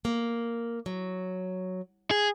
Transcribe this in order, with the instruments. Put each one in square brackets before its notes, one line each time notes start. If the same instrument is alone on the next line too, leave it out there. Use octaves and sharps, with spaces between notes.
[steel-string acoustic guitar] A#3
F#3
[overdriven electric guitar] G#4